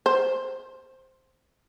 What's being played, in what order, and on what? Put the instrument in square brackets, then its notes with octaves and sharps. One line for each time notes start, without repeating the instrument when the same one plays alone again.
[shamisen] C5